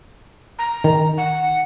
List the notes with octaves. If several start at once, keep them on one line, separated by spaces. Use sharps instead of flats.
A#5
D#3
F#5